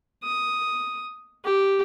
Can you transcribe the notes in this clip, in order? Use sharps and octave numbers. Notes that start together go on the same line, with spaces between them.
D#6
G4